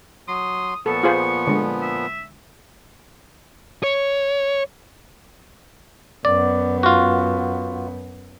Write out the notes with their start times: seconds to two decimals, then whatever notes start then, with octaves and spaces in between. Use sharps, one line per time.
0.28 F#3 C6 D#6
0.86 A#2 F3 B3 A4 C#6
1.03 F4 G#4 C5
1.47 D3 G#3
1.82 E5
3.83 C#5
6.25 F#2 B3 D5
6.83 F4 F#4